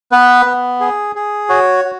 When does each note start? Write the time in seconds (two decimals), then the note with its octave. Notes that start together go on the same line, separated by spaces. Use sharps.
0.12 B3 B4
0.46 B3
0.80 G#4
1.16 G#4
1.49 F#4 C#5
1.85 F#4